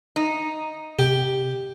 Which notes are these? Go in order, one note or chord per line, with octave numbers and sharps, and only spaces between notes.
D#4
C3 G4